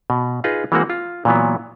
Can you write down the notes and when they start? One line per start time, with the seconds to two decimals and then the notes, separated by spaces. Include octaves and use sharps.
0.10 B2
0.44 D#4 F4 G#4 B4 D#5
0.72 E3 G#3 A#3 C4 F#4 F#5
0.90 F4
1.25 A#2 E3 F#3 B3